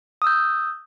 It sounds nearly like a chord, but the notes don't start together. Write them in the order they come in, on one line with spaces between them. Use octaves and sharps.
D#6 E6 G6